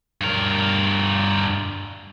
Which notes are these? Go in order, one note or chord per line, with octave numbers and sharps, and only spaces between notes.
G2 A#4